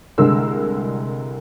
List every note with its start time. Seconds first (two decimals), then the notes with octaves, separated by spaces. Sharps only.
0.18 C2 D3 G#3 A#4 E6